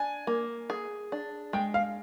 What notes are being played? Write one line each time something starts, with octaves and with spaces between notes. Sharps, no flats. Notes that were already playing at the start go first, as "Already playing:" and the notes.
Already playing: D4 G#5
A#3
G#4
D4
G#3 G5
F5